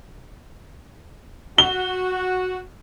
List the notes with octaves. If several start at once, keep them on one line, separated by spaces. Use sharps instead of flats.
F#4 G7